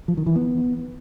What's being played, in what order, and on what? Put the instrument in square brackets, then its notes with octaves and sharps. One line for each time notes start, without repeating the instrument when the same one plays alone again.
[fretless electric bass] F3
D#3
E3
B3